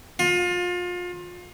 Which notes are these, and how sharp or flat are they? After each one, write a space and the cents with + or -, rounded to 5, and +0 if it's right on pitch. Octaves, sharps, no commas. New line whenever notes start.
F4 +30